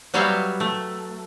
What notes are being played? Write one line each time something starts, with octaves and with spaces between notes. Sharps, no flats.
F#3 G3 B3 C#5 E5 F5
A3